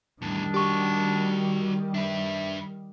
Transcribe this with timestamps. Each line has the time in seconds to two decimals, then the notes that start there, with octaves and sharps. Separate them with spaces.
0.22 E2 A2 D#3 G3 D4
0.54 F#4 G4 D5 C#6
1.94 D4 B4 E5